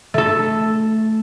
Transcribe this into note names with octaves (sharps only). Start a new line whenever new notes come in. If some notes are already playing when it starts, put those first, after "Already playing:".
A3 A4